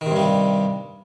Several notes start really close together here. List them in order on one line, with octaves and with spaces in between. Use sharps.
D#3 C3 G2 G3